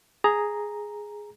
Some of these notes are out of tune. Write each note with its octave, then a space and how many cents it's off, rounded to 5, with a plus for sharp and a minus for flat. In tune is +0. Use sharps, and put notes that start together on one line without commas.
G#4 +0 A#5 +0